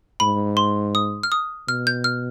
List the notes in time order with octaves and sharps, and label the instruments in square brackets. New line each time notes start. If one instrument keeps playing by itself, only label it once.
[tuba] G#2 [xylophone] B5
[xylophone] C6
D#6
F6
D#6
[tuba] B2 [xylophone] F6
[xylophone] G6
F6